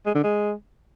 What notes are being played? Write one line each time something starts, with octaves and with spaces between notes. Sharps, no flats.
G#3
D3
G#3